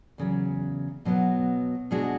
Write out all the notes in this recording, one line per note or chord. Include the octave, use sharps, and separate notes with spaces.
E2 C#3 F#3
B2 F#3 B3
B2 G#3 D4 F#4